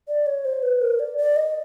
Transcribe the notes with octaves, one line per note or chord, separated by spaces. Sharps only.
D5
C#5
C5
B4
A#4
D5
D5
D#5